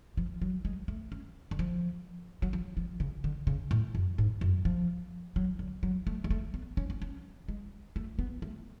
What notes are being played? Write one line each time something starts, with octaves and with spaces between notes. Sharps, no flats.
F3
F#3
G#3
A3
C#4
D3
F3
F#3
F3
F3
C#3
D3
C#3
A2
F#2
G#2
F#2
F3
F#3
D3
F#3
A3
G#3
A3
B3
C#4
B3
C#4
G#3
A3
B3
A3